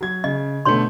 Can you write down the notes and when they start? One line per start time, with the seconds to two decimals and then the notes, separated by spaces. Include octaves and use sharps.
0.01 F#3 G#6
0.24 C#3 D#5
0.65 B2 D3 A3 C#5 C6